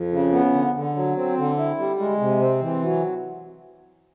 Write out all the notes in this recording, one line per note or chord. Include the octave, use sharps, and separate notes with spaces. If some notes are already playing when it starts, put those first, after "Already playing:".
Already playing: F2
C#3
B3
D3
D3
F#3
C4
D3
E4
G3
G#3
C3
C4
E3
F#3